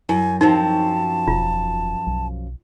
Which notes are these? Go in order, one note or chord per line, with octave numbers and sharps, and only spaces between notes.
F#2 E4 G#5
F#2 F3 C4 D#4 A5
E1 F4
B1